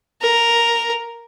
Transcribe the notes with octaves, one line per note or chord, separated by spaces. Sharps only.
A#4